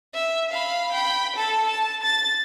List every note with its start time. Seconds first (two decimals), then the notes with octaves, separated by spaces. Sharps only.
0.14 E5
0.51 F5 B5
0.92 G5 B5
1.36 A4 A5
1.67 A5
2.03 A6